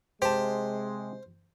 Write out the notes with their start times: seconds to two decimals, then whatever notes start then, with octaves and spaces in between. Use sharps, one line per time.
0.22 C3 G#3 G4 C5 A5